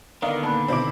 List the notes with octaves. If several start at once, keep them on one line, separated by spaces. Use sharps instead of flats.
D3 D#3 B3 A#4 D5 D#5 F5 A#5
A#2 A#3 A5 B5 F#6
D#2 B2 C4 D4 E4 D6